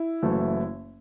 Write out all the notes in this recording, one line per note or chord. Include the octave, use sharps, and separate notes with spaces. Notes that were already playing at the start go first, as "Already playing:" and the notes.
Already playing: E4
F#1 F#2 E3 A3